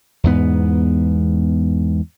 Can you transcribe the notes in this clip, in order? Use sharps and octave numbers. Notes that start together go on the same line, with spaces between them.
E2 G#2 B3